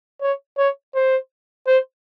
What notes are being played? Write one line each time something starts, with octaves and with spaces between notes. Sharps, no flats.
C#5
C#5
C5
C5